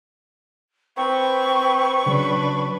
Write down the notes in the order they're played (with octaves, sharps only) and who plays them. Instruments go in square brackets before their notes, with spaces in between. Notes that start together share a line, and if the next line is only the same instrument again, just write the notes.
[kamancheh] C4 B4 [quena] C#6
[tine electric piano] C#3 F#3 [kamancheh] D4 B4